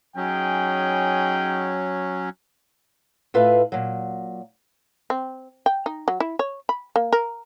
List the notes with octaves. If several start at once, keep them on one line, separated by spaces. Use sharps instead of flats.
F#3 C#4 D#4 G#4 G5
A2 F4 B4 E5 F5
A#2 F#3
C4
G5
D#4
F#3
E4
C#5
B5
A#3
A#4